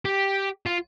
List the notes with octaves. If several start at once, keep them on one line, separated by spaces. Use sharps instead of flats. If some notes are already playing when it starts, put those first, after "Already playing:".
G4
F4